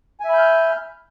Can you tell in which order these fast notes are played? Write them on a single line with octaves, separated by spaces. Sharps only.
G#5 E5 B5 G6 F6